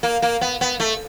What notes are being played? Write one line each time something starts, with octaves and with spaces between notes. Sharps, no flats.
A#3
A#3
B3
B3
A3